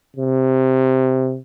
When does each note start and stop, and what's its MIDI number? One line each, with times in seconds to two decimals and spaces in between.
0.16 1.39 48